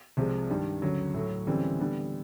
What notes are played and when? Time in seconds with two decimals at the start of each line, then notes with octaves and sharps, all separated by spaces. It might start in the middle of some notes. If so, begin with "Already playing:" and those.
0.17 C2 C3 F3 G#3
0.50 G2 D#3 G3
0.82 D2 C#3 F#3
1.14 A2 F#3 A3
1.47 D2 C#3 E3 G3 C4
1.79 D3 G3 B3